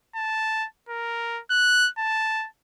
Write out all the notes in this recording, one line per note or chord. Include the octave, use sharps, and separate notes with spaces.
A5
A#4
F#6
A5